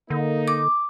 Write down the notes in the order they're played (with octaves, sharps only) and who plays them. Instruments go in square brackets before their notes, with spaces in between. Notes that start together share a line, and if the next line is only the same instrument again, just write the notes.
[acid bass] D3 [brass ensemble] A#3 D#4
[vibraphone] D6